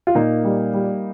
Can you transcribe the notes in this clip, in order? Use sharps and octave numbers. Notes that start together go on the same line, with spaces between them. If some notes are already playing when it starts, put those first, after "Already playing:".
F4
A#2 A#3 D#4
G3
G3